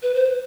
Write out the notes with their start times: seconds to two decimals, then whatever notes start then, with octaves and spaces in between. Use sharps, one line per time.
0.02 B4
0.14 C5